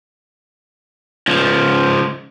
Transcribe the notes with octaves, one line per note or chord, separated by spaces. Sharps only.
C#2 F3